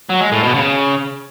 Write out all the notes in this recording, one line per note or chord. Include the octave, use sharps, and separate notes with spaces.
F#3
G#3
A2
B2
C#3